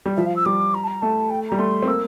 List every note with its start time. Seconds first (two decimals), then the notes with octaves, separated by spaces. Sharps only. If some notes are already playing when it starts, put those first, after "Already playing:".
0.06 G3
0.16 F3 E5
0.26 F5
0.36 E6
0.45 G3 D6
0.74 A#5
0.84 A5
0.87 A#5
1.01 A3 A5
1.30 G5
1.49 G3 A#5
1.59 A3 C6
1.82 C4
1.87 A#3 E6